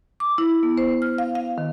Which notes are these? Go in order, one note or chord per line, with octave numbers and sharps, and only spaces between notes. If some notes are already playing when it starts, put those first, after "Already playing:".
D6
E4
B3
C5
F6
F5
F5
D#3